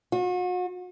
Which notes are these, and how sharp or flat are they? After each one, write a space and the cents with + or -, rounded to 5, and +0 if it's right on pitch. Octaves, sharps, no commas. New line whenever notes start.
F#4 -40